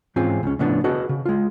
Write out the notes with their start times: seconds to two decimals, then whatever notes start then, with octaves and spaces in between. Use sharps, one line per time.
0.16 G#2 E3 C4 C#4 F4 G#4
0.43 C#2 C#4
0.59 A2 C#3 F3 B3 D4
0.84 F#4 G#4 A4 B4 D#5
1.09 C#3
1.25 G#3 F4